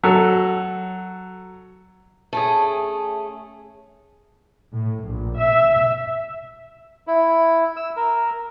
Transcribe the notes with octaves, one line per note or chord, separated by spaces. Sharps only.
F#3 A4
A3 C#4 G#4
A2
A#1
E5
E4
E6
A#4